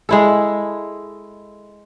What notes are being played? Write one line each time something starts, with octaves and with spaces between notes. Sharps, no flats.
G#3 E4 A4